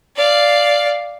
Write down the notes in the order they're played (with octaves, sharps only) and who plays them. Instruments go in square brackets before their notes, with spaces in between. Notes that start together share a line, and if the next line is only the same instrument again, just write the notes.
[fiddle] D5 F5